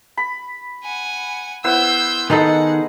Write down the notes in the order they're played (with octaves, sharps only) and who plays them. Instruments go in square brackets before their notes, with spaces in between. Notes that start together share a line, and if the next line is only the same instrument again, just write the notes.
[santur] B5
[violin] F#5 G#5
[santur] B3 E4 C5 [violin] E6 G6
[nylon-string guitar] D#3 [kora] B3 D#4 A4 [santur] G#4 D#5 [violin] F#5